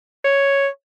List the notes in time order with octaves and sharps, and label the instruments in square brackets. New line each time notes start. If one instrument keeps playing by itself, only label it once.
[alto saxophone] C#5